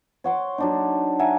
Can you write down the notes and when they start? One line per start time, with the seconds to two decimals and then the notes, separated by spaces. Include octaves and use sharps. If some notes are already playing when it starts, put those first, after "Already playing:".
0.24 C#5 F#5 C6 D6
0.58 F#3 D4 D#4
1.19 E5 F#5 G#5 A#5